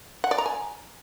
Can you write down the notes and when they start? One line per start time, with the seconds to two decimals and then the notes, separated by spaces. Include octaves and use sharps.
0.24 F#5
0.31 D5
0.38 A#5
0.46 G#5